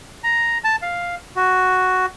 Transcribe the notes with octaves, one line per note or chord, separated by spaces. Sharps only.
A#5
A5
F5
F#4